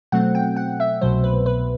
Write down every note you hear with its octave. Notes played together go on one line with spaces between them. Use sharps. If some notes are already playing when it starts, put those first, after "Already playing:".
B2 F#3 A3 C4 F#5
G5
F#5
E5
C2 B2 F#3 C5
B4
B4